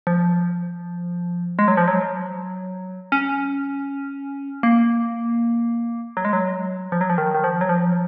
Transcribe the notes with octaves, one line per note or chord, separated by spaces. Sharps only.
F3
G#3
F#3
F3
F#3
C#4
A#3
F#3
G#3
F#3
F3
F#3
F3
D#3
D#3
F3
F#3
F3